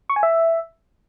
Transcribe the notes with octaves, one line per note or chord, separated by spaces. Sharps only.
C#6
G#5
E5